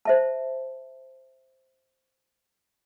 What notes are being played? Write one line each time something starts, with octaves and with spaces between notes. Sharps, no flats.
C5 E5 A5